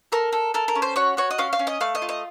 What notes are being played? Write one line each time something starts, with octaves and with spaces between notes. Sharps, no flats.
A4 A#4
A4
A4 A#4
A#4
C#4
C5
F#4 C#5
F#4 C#5
D#5
C#4 F5
F5
C#4
D#5
A3 F5
D#5
F4
D#5